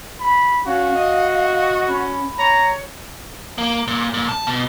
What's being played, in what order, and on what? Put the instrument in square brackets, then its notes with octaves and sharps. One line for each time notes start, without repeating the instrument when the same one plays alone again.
[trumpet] B5
[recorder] C#4 [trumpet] F#4 [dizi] F5
[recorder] D#5
[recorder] C#4 [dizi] B5
[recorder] C#5 [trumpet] A#5
[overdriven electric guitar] A#3
A#2
A#2
A5
B2